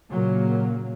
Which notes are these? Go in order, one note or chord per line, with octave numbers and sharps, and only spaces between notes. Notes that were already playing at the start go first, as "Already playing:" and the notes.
A#2 C#3 F#3 A#3